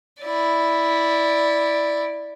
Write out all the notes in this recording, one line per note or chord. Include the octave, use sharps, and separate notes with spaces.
E4 D5